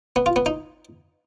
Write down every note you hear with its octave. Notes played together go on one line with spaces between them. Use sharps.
B3
F4
B3
D#4